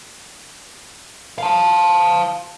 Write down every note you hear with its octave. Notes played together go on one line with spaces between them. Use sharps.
F5 A5